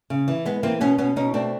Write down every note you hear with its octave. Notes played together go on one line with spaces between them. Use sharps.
C#3
E3
G#3 B3
E3 A#3 C4
B2 B3 C#4
B2 B3 C#4
B2 C#4 D#4
A3 C4 D4